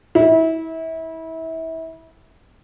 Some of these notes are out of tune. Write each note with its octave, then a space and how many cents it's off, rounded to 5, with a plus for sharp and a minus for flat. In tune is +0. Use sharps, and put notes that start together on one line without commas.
E4 -30